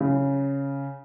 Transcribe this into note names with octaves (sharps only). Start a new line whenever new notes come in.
C#3